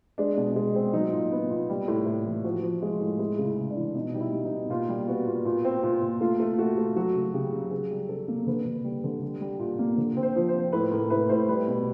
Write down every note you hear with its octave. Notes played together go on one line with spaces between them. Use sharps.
G#3 D4
B2
G#3
C4
F#3 D#4
A#2
B3
A#2
G3
A2
A2
E3
F3 F#4
F3
G#3 F4
A2
G#3 E4
C#3
E4
C#3
D4
E3
B2 D#4
G3 D#4
E4
G3
D#4
B2
A#2 F4
G3
B3 F#4
A#2
A#2
C4
A#2
A#2
A3 F4
A3
A3 F#4
A3
F#3 F#4
C#3
C#3 G4
F#3
C#3 G#4
G3
C#3 A4
A#3
D3 B4
D3
G3
D3
G3
G3
A#2
A#3
D3
C4
C5
F3
C5
C4
A2 B4
A2 A#4
A2 B4
A2 C5
G3 B4
B2